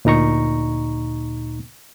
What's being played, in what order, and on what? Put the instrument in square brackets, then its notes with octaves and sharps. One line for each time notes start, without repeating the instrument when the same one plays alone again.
[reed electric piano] D2 A#2 D#4 A#5 C#6